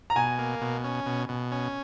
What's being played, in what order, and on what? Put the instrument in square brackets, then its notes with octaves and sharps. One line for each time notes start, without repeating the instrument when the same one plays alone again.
[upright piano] A#5
[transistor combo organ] B2 [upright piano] G#5
[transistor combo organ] A#3
B2
C#4
B2
B2
C#4